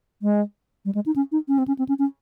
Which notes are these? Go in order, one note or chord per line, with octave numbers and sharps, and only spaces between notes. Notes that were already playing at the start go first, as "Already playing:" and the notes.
G#3
G3
G#3
D#4
C#4
D#4
C#4
C4
C#4
C4
C#4
C#4